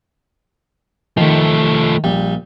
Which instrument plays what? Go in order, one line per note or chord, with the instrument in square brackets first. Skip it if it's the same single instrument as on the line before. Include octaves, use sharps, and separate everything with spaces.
[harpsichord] D#3 [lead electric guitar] F3 A3
[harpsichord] A#1 G3